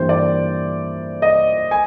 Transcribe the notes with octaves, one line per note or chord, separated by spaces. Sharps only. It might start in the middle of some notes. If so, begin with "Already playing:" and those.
Already playing: G2 E3 G3 A#3 C5
D5
D#5
G#5